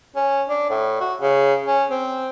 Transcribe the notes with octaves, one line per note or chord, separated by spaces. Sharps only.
C#4
D4
A2
F#4
C#3
C#4
C4